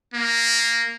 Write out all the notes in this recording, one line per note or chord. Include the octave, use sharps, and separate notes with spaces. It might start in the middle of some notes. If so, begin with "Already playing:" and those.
A#3